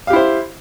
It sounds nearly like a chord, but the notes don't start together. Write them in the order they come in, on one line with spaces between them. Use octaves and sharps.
F5 G4 E4 C5